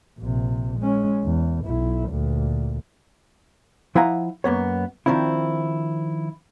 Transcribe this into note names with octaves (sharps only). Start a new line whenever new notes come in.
A#1 C3
G#3 C#4
E2
B1 E4
D2 A#2
F3 E4 F5 F#5 G#5 A#5
F#2 A#3 B3 C#5
D#3 F3 C4 D4 E4